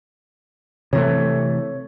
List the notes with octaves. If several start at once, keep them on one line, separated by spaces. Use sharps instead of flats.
C3 E3 A3 C#5